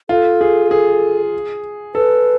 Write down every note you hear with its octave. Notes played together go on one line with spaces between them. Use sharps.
F4 A4
G#4
G#4
A4 B4